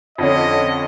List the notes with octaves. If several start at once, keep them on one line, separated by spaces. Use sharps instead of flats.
F2 D3 C#4 D#5